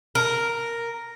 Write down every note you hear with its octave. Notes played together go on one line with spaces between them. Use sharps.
A#4